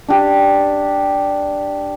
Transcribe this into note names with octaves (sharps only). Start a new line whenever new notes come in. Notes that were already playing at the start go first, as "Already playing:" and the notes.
D4 G4